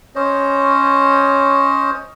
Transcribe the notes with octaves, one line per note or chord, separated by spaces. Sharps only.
C#4 C5 C#5 D#5